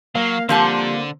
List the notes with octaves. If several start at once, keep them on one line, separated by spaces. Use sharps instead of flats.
F#3 A#3 F5
D3 F3 G3 A#3 C4 A5